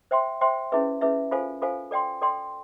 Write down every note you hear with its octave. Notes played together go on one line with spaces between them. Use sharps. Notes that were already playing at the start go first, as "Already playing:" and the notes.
C5 E5 G5 C6
C5 E5 G5 C6
C#4 E4 G#4 B4 E5
C#4 E4 G#4 B4 E5
F4 A4 C5 F5 G#5
F4 A4 C5 F5 G#5
A4 D5 G5 C6
A4 D5 G5 C6